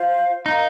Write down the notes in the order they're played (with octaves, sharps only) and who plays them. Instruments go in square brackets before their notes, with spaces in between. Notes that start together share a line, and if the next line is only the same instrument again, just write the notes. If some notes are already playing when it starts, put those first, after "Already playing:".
Already playing: [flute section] F4 C5 F5
[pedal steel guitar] D#4 [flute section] A#4 F5 A#5